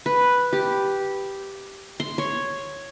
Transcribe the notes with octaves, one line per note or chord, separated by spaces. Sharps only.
B4
G4
C6
C#5